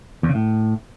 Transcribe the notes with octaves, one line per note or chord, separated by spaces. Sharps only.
E2
C#3
A2